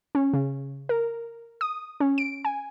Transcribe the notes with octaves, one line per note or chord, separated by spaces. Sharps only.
C#4
C#3
A#4
D#6
C#4
D7
G#5